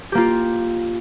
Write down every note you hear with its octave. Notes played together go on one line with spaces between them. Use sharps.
A#3 F4 G4